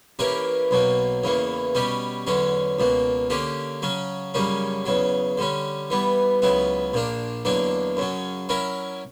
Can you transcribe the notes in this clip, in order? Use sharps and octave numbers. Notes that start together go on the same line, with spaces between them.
E3 A#3 C#4 G4 A#4
B1 B2 F#3 A#3
E2 C#3 E3 A#3
B2 G3 C#4 G4
E2 D3 F#3 C#4
C#2 B2 A#3
D3 A#3 C#4 G4
C#3 F#3 C#4
F#2 C#3 G3 A#3 C#4
E2 C#3 F#3
D3 G3 C#4
E3 G3 B3
C#2 C#3 F#3 B3 E4
A#1 A#2 A#3 D4
E2 D3 F#3 A#3 D4
F#2 C#3 F#3
F#3 C#4 E4 A#4